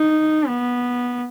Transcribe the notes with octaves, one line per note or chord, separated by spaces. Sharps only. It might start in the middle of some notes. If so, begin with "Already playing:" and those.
Already playing: D#4
B3